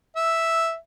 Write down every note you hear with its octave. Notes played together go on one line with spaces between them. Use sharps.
E5